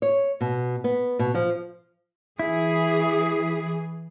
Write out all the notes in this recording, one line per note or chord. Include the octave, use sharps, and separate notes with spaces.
C#5
B2
B3
B2
F3
E3 E4 G#4